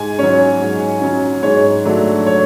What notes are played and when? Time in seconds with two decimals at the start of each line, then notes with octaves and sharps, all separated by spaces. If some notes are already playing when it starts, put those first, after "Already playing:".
Already playing: G#2 G#5
0.19 F#3 C#4 C#5
0.61 G#2
1.02 F#3 C#4
1.43 G#2 C#5
1.85 F#3 A3 D4
2.27 C#5